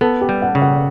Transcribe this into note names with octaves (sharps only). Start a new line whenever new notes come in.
B3 A4
G4
G3
F#5
C#3
F#5